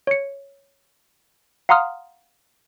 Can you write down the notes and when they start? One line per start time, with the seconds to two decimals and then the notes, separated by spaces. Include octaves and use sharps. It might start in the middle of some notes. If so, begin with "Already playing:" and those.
0.07 C#5 C#7
1.69 F5 F#5 A#5 C6 D#6 F6